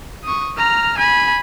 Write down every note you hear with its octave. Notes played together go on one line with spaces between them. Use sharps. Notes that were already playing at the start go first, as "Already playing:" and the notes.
C#6 D#6
A#5 F6
G#5 B5